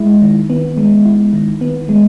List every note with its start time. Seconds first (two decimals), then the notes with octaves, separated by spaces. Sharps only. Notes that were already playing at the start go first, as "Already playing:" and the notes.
Already playing: G#3 E4
0.22 D#3
0.50 B3
0.77 G#3
1.06 E4
1.33 D#3
1.61 B3
1.89 G#3